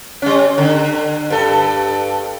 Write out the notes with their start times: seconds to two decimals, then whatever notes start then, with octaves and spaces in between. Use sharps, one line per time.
0.22 G3 C#4
0.58 D3
1.30 G2 A4